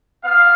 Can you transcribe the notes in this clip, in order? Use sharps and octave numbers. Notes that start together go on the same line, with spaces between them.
B3 F5